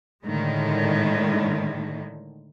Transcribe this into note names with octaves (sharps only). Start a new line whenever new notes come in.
A2 D3 D#3 G#3